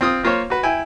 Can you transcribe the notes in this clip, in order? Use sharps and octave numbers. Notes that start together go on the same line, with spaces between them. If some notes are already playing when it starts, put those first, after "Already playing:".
C4 F4 D#6
A#3 F4 C5 C#5
F#4 B4
E4 G5 G#5